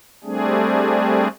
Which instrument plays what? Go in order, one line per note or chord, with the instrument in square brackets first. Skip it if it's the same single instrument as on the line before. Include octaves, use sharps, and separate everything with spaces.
[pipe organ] G3 A3 C4 D4 G#4